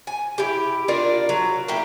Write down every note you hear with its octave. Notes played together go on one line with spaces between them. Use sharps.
G#5
E4 G4
D4 F4 A#4 D5
F#3
A#3 E4 G4